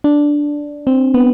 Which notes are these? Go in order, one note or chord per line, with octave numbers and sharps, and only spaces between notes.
D4
C4
B3